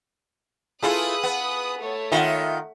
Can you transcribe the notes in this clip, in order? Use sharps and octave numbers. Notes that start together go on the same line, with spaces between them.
A3 E4 F4 G#4 B4 D#6 F#6
B3
A3 C#5
D#3 F4 E5 F#5